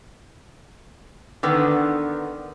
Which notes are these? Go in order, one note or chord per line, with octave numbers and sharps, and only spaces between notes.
D3 D#3 B3